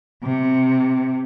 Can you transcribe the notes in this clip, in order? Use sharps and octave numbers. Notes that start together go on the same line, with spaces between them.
C3